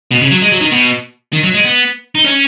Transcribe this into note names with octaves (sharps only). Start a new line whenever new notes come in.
B2
C#3
F#3
G#3
F#3
D#3
B2
D#3
F#3
G#3
B3
D#4
C#4